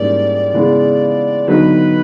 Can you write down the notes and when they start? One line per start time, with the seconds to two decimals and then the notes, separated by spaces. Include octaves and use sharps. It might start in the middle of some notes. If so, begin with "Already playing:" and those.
Already playing: G#2 E3 G3 A#3 C#4 D5
0.54 C#3 E3 G#3 B3
1.48 D3 F#3 B3 D#4 B4